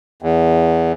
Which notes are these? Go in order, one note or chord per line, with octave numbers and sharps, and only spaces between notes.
E2